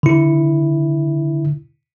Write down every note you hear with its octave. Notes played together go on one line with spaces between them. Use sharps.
D3 E4